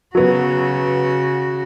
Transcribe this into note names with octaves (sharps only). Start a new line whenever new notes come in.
C#3 F#3 B3 F#4